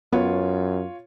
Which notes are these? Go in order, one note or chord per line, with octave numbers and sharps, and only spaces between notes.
F#2 B3 F4 C#5